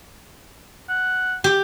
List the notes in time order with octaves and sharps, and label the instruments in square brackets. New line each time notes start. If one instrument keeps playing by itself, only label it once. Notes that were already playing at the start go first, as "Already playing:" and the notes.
[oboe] F#5
[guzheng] G4